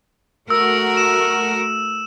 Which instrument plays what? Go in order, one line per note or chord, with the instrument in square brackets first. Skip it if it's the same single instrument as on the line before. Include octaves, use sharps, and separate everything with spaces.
[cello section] A3 F#4 A#4 [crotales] E6
[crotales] E7